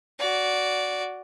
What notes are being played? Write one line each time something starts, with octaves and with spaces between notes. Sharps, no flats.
F#4 D5